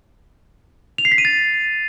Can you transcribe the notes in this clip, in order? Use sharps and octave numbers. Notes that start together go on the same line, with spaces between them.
F7
C7
B6
D#7
A6